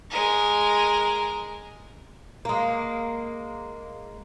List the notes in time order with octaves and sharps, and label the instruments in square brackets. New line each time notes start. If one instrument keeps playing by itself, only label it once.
[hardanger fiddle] G#3 A#4
[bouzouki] G#3 A#3